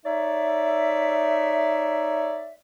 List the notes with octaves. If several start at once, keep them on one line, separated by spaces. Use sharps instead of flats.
D#4 C#5 D5 E5